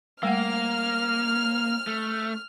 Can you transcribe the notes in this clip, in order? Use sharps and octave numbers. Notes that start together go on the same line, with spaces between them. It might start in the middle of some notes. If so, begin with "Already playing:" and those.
G3 A3 A#3 F#5 F6
A3